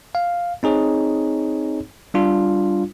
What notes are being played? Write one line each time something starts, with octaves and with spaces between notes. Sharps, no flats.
F5
C4 D#4 G#4 C#5
G3 D4 F4